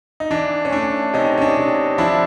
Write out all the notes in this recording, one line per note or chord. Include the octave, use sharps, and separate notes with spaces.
D#4
E3 D4
C#4
A3 D4
C3 C#4 D#4
C#4
D4
C3
F3 D4 E4